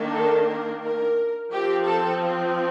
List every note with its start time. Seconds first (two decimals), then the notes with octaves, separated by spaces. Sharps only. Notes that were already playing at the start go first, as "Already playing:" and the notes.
Already playing: D#3 A#3 D4
0.14 A4
0.48 A#4
0.82 A#4
1.51 F3 C4 G4
1.86 A4